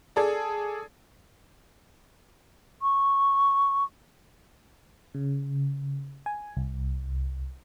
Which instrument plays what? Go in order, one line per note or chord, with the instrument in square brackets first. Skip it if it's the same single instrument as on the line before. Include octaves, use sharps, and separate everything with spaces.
[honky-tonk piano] G#4 A4 D5
[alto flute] C#6
[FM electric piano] C#3
G#5
C2